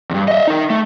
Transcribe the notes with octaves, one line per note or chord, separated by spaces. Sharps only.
E2 G2
D#5 E5
D#4 A#4
A3